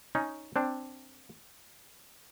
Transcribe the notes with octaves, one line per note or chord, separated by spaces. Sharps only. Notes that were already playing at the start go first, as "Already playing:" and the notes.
C#4 D#4
C4 D4